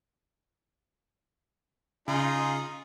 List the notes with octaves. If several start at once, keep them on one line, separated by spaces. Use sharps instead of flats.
C#3 D#4 F4 G#4